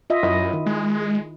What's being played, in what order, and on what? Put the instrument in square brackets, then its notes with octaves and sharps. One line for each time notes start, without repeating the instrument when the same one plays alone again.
[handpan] F4 D#5 E5
[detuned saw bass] F#2 [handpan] E4 D#5
[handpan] D#3
[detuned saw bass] G#3